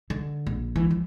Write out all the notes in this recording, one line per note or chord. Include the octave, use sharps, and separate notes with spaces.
D3
A#1
E3
F3